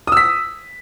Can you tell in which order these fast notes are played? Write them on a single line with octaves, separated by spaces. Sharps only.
D#6 E6 B6